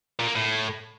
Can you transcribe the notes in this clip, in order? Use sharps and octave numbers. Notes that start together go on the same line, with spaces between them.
A#2
A#3
A2